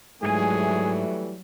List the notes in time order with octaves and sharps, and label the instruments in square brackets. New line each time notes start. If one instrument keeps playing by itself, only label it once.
[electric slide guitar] G#2 G4 G#5 [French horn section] E3 G3 A3 [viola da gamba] F#3 [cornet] G#4